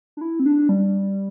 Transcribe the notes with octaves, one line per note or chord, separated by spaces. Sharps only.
D4
E4
C4
D4
G3